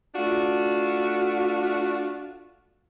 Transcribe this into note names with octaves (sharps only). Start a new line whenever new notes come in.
A3 D4 F4 F#4